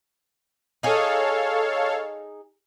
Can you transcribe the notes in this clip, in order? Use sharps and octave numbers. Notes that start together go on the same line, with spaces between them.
D#4 G#4 A4 C#5 F5